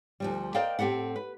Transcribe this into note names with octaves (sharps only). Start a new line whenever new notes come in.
D2 F3 G3
A#4 C5 D5 D#5 F5 G5
A2 C4 G4 A4 F#5
B4